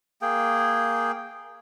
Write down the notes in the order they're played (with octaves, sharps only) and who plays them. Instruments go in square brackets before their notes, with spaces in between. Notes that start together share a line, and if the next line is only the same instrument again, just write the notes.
[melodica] A#3 G#4 G5